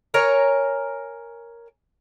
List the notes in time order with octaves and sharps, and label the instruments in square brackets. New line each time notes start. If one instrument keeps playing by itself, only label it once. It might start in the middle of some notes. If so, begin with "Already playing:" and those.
[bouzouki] A#4 C#5 G#5 A#5